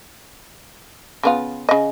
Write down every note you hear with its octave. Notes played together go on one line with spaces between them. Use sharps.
C#3 B3 F4
C#3 D#5